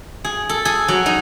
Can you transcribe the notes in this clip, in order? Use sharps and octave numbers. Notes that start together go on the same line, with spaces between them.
G#4
A4
G#4
F#3
D#4